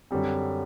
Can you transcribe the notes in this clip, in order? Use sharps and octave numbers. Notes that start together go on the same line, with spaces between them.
F#2 D3 G3 C4